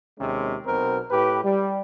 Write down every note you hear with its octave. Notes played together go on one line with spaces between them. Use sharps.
D#2 C3 G#3 C#4
B1 B2 C4 A#4
A2 G4 B4
G3